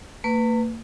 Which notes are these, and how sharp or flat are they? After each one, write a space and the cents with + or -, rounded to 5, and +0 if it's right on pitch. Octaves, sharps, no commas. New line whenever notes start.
A#3 -40 B4 +5